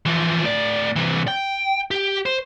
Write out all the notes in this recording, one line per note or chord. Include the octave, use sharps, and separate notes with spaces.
E3 F3
A2 D5
C3 E3
G5
G4
C5